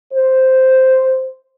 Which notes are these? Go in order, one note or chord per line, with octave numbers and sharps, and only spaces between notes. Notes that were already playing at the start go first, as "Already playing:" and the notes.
C5